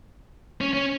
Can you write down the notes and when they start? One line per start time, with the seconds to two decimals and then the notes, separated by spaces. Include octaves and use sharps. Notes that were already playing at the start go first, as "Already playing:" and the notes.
0.61 C#4
0.74 C#4